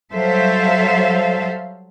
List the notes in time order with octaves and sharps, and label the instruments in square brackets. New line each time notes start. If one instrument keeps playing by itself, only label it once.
[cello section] F#3 G3 A4 C5 E5 F5